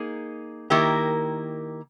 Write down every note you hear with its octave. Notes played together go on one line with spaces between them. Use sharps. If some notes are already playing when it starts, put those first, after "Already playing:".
Already playing: A#3 D#4 G#4
D#3 A#3 E4 G4 A#4